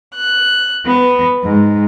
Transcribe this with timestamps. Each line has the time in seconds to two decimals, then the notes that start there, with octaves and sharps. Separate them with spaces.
0.15 F#6
0.86 B3
1.44 G#2